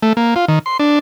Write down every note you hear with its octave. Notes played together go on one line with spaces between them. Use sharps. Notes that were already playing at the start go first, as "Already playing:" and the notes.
A3
A#3
F4
D#3
C6
D4